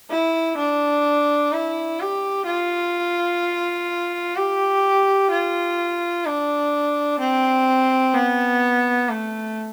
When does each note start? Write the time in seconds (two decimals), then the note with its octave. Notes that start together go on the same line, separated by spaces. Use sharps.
0.10 E4
0.58 D4
1.52 E4
2.00 G4
2.47 F4
4.36 G4
5.31 F4
6.26 D4
7.20 C4
8.15 B3
9.09 A3